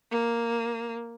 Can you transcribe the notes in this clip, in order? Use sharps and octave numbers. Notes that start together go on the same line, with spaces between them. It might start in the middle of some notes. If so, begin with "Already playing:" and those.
A#3